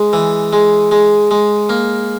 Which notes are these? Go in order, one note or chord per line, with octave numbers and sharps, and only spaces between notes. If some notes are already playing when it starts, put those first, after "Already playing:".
Already playing: G#3
E3
G#3
G#3
G#3
A#3